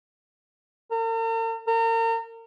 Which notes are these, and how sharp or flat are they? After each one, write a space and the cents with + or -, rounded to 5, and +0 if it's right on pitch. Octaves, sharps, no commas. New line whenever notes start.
A#4 -45
A#4 -35